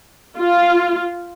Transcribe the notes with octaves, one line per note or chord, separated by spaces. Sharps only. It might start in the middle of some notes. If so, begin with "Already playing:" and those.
F4